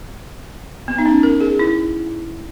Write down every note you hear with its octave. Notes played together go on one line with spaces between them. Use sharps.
B3
D#4
C#4
A#4
G#4
E4